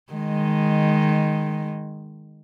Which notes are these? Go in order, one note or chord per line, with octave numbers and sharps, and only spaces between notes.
D#3 G#3